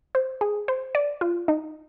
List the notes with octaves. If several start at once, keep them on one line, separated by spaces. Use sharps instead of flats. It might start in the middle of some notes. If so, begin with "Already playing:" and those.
C5
G#4
C5
D5
F4
D#4